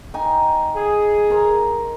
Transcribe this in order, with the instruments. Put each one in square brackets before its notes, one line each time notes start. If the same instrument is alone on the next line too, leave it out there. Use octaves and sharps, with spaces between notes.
[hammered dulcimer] D#4 G5 G#5
[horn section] G#4
[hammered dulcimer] A#4 C5